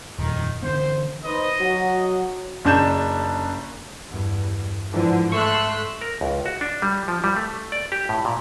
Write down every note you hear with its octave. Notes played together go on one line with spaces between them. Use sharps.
D#1 F2 D#3
D3 E3 B3 C5
D#4 B4 C5 D#5
F#3 F#4
F#1 C#3 D4 A5 G6 E7
E2 G2
G#2 D3 E3 F3
A3 C6 C#6 E6 F#6
A#4
C#2
F#4
D4
G3
F3
G3
A3
D5
G4
A2
A#2